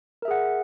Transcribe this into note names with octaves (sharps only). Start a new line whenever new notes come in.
G#4 A#4 E5 F#5